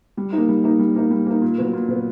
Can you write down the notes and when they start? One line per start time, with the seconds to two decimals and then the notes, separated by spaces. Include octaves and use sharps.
0.17 G3
0.33 A#3 D#4
0.49 G3
0.64 A#3 D#4
0.79 G3
0.96 A#3 D#4
1.11 G3
1.26 A#3 D#4
1.42 A#2
1.58 F#3 B3
1.73 A#2
1.89 F#3 B3